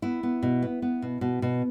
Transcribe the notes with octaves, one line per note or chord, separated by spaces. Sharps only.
B3 E4
B3
B2
B3
B3
B2
B2
B2